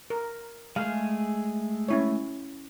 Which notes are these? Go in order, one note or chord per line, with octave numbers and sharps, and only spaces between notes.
A#4
G#3 A3 G#4 F5
C#4 E4 C#5